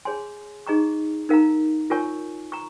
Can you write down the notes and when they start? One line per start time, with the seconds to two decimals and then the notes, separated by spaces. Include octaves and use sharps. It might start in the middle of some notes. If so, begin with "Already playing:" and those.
0.05 G#4 C#5 G#5 C6
0.67 D#4 G#4 D#5 A#5 C#6
1.29 D#4 A#4 F5 A#5
1.90 F4 A#4 C#5 G#5 C#6
2.52 A#5 C#6